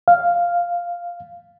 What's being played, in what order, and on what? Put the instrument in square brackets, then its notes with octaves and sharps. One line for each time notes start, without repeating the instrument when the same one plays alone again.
[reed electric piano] F5